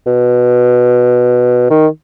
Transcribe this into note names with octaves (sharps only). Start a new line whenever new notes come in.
B2
D#3